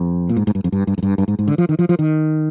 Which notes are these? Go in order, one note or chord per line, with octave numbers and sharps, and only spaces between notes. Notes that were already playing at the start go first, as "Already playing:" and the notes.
Already playing: F2
A#2
G#2
G#2
G2
F2
G2
G2
F2
G2
G2
G#2
G#2
D3
F3
D#3
F3
F3
D#3